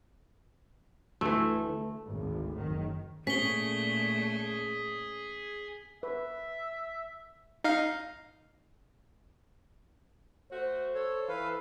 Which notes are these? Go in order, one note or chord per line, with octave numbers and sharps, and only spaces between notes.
D2 E3 A3
G#1 D2
F#1 D#3
A#2 A3 C#4 G#4 B6 G7
B4 E5
D#4 F5
A3 F#4 C5
A4 C#5
E3 B4 F5